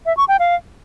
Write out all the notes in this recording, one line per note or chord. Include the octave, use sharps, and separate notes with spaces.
E5
C#6
G5
F5